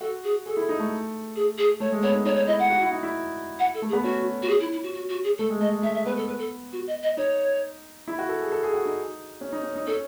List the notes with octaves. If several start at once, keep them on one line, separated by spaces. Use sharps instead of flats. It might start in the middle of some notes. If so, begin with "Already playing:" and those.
F#4 A4
G#4
G#4 A4
E4
D#4
A3
G#4
G#4
A3 C#5
G#3
B3 C#5
D#4
D#4 C#5
C#5
E4 D#5
F#5
F#4
E4
D#4
E4
F#5
A4
A3
G#4
B3
C#4 F#4
F#4
G#4
E4
E4
F#4
F#4
F#4
G#4
A3 A4
G#3
A3 D#5
G#3
A3 E5
E5
B3 B4
A4
B4
A4
F#4
D#5
D#5
D#4 C#5
E4
F#4
A4
G#4
A4
G#4
F#4
D#4
C#4
D#4
C#4
D#4
C#4 A4